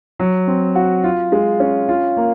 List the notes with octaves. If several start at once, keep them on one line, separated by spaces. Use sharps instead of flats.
F#3
C4
F#4
F4
G#3
C#4
F4
A#3